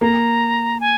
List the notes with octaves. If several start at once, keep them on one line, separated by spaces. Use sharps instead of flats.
A#3 A#5
G#5